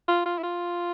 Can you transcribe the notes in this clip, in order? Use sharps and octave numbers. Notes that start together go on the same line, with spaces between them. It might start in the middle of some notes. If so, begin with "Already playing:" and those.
F4
F4
E4
F4